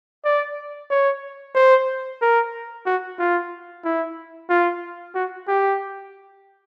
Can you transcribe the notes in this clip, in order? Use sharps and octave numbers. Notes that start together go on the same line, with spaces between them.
D5
C#5
C5
A#4
F#4
F4
E4
F4
F#4
G4